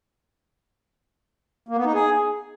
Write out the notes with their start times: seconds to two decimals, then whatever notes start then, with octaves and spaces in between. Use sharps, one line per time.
1.68 A#3
1.77 B3
1.85 D#4
1.93 G#4